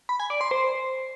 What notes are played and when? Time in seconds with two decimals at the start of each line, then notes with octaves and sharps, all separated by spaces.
0.09 B5
0.20 G#5
0.30 D5
0.41 C6
0.51 C5